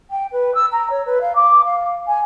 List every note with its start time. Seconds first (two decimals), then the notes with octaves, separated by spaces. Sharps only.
0.10 G5
0.31 B4
0.54 E6
0.72 A#5
0.90 C#5
1.05 B4
1.20 F5
1.35 D6
1.64 F5
2.07 G#5